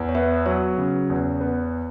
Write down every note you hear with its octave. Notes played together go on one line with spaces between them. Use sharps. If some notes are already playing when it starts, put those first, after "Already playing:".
Already playing: E2
C#5
B3 B4 E5
F#3 C#5
C#3
E2
B3